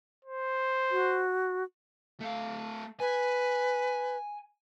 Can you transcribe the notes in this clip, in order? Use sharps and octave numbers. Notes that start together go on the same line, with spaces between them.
C5
F#4
A3 F5
B4 G#5